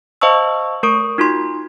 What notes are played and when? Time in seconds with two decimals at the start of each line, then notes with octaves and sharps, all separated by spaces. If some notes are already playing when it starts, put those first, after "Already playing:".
0.21 C5 D#5 F5 A5 C#6 E6
0.83 A3 A#4 C#6 D#6 D7
1.18 D#4 F4 F#4 C6